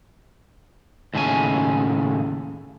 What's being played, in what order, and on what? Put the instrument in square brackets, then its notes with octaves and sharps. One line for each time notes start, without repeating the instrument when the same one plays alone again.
[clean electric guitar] D#2 A2 C#3 C#4 G#5